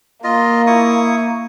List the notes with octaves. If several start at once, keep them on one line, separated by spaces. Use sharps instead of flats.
A#3 F4 D#5
E4 C#6 D#6